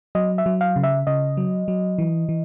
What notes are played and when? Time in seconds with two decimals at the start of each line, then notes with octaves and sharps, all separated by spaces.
0.15 F#3 D#5
0.38 E5
0.46 F#3
0.61 F5
0.76 C#3
0.83 E5
1.07 C#3 D#5
1.37 F#3
1.68 F#3
1.98 E3
2.29 E3